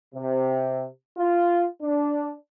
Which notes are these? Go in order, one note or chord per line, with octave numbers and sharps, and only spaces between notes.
C3
F4
D4